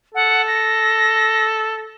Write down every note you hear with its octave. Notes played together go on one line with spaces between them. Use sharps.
A4 F#5
A#6